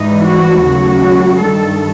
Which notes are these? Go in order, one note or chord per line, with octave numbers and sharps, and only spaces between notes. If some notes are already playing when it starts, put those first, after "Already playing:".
Already playing: G#2 E3 G3 D#4
F#4
D#2 C#3 F#3 A3 F#4
G2 D#3 G3 A4